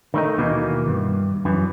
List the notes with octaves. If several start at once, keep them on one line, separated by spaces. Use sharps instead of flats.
D#3 A3 D#4
D#2 B2 E3 A#3
G2
F#2 E3